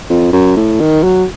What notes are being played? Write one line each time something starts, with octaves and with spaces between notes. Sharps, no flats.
F2
F#2
A2
D#3
F#3